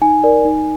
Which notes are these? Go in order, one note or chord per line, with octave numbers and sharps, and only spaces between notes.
D#4 G#5
A#4 D5
D#4